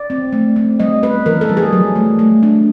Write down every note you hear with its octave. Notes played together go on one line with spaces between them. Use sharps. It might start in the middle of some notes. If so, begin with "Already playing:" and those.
Already playing: D5
C4
A3
C4
G3 D#5
B3 B4
E3 A#4
A4
G3
G#4
F#3
A3
A3
D4